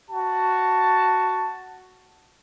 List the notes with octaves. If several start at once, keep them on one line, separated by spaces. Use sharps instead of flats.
F#4 A5